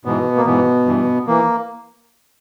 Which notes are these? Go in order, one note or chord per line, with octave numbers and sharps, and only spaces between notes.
G#2 B2 E3 B3
A#3
G#2 B2 E3 B3
G2 E3
E3 A#3